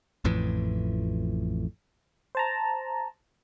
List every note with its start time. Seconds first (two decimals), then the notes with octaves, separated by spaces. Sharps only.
0.24 A1 F2 A2 E3
2.35 C5 A5 A#5